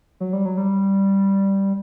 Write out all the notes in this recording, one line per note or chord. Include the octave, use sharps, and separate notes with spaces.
F#3
G3
F#3
G3